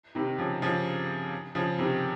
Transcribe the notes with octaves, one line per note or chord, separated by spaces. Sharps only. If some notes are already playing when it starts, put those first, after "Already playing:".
C3 D#3
C#3 F3
C#3 F3
C#3 F3
C3 D#3